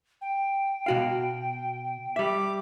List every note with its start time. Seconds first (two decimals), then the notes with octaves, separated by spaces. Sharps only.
0.21 G5
0.86 B2 F#4 F5
2.16 G3 E5 D6